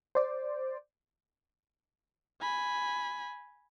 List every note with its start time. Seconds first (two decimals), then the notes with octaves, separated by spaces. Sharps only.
0.15 C5 D5
2.41 G#5 B5